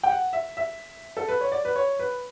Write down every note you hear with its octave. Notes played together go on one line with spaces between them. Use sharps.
G5
F#5
E5
E5
A4
B4
C#5
D5
B4
C#5
B4